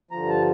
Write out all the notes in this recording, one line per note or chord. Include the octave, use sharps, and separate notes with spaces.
G2 D3 F3 A#5
A5